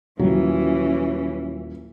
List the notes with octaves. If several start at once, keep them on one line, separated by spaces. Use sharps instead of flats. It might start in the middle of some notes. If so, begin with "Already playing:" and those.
D#1 E3 F#3 C#4